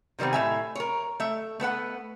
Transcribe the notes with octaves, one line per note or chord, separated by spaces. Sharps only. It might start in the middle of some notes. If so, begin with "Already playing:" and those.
C3 D#3 G3 B3 C4
A2 E5 G#5
A#4 C#5
A3 E5
A3 B3 B4 F#5